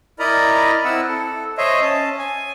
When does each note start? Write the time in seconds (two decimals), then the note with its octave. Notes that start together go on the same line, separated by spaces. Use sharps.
0.19 E4 A#4 D5 D#5 A#5 B5
0.85 C4 E4 F#5 E6
1.09 A4
1.58 C5 C#5 D#5 E5
1.82 C#4 A5
2.19 G#5